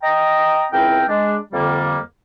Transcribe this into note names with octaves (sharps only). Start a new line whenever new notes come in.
D#5 G5 A#5 D#6
C#2 E3 C4 E4 A#4 G5
G#3 D4
F2 D3 G3 A#3